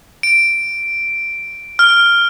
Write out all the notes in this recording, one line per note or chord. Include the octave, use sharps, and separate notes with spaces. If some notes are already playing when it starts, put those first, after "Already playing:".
D7
F6